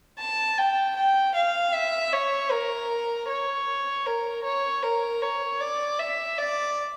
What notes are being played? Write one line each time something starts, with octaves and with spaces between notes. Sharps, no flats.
A5
G5
G5
F5
E5
C#5
A#4
C#5
A#4
C#5
A#4
C#5
D5
E5
D5